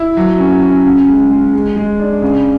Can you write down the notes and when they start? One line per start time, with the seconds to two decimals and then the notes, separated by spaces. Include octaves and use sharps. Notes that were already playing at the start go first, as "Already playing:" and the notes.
Already playing: E4
0.17 F#3
0.39 C#4
0.62 C#4
0.86 C#3
1.08 G#3
1.31 G#3
1.53 G#3
1.76 G#3
2.00 D4
2.22 C#3